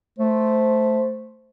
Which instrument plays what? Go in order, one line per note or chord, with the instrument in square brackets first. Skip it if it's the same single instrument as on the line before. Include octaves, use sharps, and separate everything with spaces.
[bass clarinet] A3 [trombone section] C5